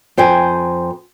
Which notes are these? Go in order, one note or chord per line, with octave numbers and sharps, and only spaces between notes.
F2 C5 G5 G#5